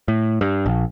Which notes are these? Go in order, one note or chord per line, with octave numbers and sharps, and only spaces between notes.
A2
G2
A#1